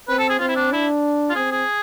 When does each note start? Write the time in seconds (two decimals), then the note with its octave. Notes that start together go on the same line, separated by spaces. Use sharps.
0.09 C4 B4
0.19 A4
0.30 G#4
0.40 C4 F4
0.49 E4
0.56 D4
0.72 D4 E4
1.30 F4
1.36 C4 G#4
1.52 G#4